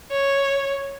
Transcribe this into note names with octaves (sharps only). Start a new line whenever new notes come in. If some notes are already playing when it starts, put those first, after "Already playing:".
C#5